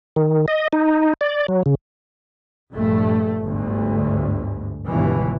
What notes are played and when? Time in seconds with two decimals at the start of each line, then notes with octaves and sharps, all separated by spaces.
0.16 D#3
0.48 D#5
0.73 D#4
1.21 D5
1.48 F#3
1.66 C#3
2.74 A#1 G2 A3
3.42 G1 D2 G#2
4.89 G1 C#2 B2 E3